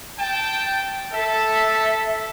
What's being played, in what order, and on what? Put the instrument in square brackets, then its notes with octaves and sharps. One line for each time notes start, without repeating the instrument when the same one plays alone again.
[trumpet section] G5 A5
[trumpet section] A4 [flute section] E5 A5